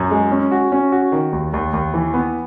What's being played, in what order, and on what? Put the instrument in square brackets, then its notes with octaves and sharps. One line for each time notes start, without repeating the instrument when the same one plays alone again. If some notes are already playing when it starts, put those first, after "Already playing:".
Already playing: [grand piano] F#2
G#3
C#4
F#4
C#4
F#4
D#3
D#2
D#2
D#2
E3
B3